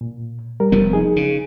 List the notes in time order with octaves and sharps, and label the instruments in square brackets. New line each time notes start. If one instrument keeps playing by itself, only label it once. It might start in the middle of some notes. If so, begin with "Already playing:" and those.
[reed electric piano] A#2
G3 A#4
[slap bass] F1 F3 B3
[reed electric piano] D#4 G#4
[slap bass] C#3